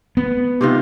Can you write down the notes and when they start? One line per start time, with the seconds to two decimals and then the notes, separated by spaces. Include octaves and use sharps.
0.17 B3
0.61 C3 D#3 F4